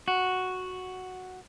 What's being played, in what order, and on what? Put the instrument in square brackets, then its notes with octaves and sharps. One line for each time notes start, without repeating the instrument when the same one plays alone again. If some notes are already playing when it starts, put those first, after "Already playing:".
[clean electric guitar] F#4